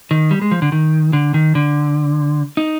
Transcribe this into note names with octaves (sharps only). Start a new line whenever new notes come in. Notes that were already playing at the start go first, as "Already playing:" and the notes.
D#3
G3
G#3
F3
D3
D#3
D3
D#3
D3
D#4